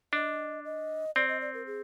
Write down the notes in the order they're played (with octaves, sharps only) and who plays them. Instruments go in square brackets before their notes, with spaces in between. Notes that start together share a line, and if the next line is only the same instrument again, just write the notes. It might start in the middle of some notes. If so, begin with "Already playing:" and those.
[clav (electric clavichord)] D4 [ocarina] D#5
[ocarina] D#5
[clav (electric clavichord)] C4 [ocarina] D5
[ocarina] D#5
D5
A#4
G#4